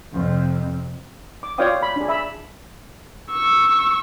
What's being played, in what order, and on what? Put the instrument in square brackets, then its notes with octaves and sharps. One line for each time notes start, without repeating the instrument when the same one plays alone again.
[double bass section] F2 C3 C4
[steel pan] D6
F4 C#5 D5 F5 G5 D#6
B5
D4 G#4
E5 B5
[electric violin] C#6 E6